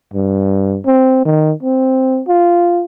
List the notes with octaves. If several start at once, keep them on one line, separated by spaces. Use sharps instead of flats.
G2
C4
D#3
C4
F4